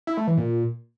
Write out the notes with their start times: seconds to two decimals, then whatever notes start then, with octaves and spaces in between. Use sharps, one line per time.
0.07 E4
0.17 A3
0.27 E3
0.37 A#2